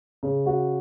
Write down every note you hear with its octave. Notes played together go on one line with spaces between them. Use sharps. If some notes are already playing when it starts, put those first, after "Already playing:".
C#3
F#4